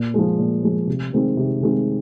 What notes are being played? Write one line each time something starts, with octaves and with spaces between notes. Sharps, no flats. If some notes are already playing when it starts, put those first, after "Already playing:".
Already playing: A#2
F3 G#3
A#2
F3 G#3
C3
D#3 G#3 C4
C3
D#3 G#3 C4